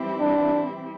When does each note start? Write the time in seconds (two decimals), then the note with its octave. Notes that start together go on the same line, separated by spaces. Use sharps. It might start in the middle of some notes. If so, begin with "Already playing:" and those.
Already playing: E3 G3 C4 E4 G4
0.20 D4